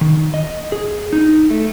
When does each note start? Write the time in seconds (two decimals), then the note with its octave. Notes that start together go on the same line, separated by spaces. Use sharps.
0.01 D#3
0.34 D#5
0.72 G#4
1.13 D#4
1.50 A3